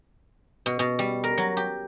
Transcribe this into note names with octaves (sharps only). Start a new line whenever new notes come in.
B2
B2
G3
A#4
F#3
G4